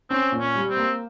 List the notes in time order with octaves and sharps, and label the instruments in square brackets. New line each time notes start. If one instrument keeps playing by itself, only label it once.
[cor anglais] C4 [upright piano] C#4
[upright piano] A#2
[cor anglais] C#4
[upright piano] G3
[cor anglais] C4
[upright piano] A#3